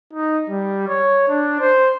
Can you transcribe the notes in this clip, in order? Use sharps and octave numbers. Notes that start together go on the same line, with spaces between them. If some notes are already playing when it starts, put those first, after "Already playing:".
D#4
G3
C#5
D4
C5